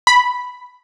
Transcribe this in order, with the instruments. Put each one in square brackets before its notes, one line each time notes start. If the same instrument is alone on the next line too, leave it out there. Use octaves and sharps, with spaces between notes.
[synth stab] B5